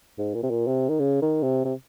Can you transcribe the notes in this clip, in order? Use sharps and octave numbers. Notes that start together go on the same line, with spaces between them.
G#2
A#2
C3
A#2
C3
D#3
C#3
D#3
C3
C3